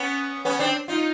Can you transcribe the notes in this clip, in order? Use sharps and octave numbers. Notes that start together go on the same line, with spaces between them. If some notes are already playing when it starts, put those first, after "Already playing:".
Already playing: B3 C#4
B3 C#4
C4 D4
D#4 F4